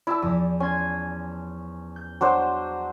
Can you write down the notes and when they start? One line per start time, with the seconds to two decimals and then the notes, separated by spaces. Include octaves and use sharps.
0.07 E4 D5 A5 B5 E6
0.22 E2 F3 D#6
0.60 C#4 G#5 C6 G#6
1.96 G6
2.21 F#3 D4 C5